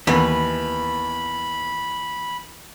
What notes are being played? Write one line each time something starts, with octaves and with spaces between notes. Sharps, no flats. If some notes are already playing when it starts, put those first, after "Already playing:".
D#2 E3 B3 B5